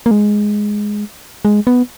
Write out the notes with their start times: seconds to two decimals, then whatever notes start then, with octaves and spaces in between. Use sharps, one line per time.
0.06 A#3
0.11 G#3
1.45 G#3
1.67 B3